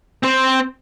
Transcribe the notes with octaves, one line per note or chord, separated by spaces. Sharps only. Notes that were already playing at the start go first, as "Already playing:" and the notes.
C4 C5